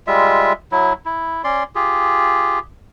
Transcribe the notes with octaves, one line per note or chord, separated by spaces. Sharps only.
G3 G#3 F4 E5
F#3 E4
E4
C#4 D5 C6
F4 G4 G#4